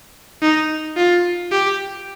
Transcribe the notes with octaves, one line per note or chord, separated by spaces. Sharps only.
D#4
F4
G4